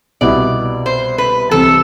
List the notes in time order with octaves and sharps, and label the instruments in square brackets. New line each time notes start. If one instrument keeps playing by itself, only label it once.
[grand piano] C2 B2 G3 B3 E4 [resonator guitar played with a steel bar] D5
[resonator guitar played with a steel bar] C5
B4
[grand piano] C2 C3 E3 [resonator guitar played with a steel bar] A4